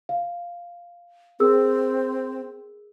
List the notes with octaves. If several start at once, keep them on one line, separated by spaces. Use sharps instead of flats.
F5
C4 G#4 A#4 E6